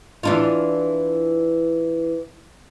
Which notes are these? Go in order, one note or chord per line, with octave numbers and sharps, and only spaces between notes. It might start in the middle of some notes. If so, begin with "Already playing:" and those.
E3 D4 F4